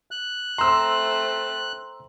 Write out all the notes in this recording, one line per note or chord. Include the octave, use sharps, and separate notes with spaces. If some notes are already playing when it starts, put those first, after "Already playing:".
F#6
A3 C4 A#5 C6 E6